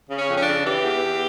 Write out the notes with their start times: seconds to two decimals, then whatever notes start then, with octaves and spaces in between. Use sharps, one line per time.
0.10 C#3
0.17 C#4
0.29 F2
0.37 C#4
0.42 D4
0.47 C#3
0.65 E3 G4
0.83 E2
1.01 E2